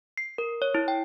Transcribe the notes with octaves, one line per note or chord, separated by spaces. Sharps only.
C7
A#4
C#5
E4
G5